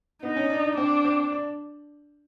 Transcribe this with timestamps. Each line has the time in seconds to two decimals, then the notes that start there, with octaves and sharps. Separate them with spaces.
0.23 B3 D#4
0.36 C#4
0.50 D4
0.64 D4
0.77 C4 D4
1.04 C4
1.32 D4